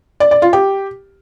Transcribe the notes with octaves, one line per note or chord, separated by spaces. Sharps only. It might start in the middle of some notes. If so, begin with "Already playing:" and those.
D5
D5
F4
G4